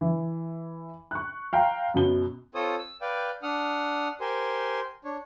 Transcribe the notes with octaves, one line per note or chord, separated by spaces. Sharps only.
E3
C#6 F#6
F5 G5 A#5 C6
F#2 B2 G7
C4 F4 A4 C5 C#5 D#6
E6
B4 D5 F5 G5
D4 F#5 D#6 F6
G4 A#4 C5 G#5 C6
D4 C#5